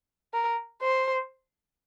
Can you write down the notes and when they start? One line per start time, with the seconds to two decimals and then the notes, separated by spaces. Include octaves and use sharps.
0.33 A#4
0.82 C5